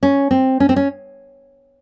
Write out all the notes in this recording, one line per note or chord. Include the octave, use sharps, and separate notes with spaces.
C#4
C4
C#4
C4
C#4